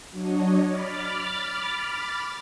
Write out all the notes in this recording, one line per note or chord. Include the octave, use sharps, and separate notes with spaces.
F#3 D4 C#5 D#5
B5 D6 F6 A6